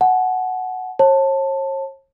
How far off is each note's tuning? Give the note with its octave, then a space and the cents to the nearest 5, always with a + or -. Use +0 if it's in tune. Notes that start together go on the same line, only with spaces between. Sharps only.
F#5 +0 A5 -40
C#5 -40 A5 +10